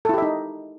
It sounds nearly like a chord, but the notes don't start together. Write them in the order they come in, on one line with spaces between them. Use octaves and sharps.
A4 E4 G4 E5 D#4